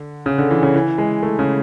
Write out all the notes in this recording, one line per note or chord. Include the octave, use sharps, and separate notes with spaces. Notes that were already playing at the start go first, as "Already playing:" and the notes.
Already playing: D3
C#3
D3
E3
C#3
E3
G#3
A3
C#3